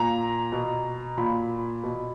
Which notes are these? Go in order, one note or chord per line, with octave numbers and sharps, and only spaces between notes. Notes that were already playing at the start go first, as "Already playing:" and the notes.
Already playing: A#2 A#5
B2
A#2 B5
B2